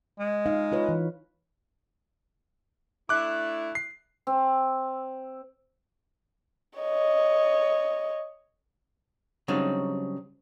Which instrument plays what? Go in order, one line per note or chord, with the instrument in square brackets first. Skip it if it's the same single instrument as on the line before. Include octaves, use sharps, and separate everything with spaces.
[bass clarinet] G#3
[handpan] D#4 F5
F4 B4 C#5
E3
[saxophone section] A3 D4 E4 [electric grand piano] D6 F#6
[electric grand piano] C7
[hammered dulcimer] C4
[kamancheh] C#5 D#5
[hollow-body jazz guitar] C#3 F#3 G3 C4 D4 D#4